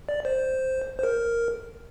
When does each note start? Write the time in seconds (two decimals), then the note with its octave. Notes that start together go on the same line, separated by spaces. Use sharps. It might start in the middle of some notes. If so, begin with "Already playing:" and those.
0.09 D5
0.25 C5
0.99 C5
1.03 A#4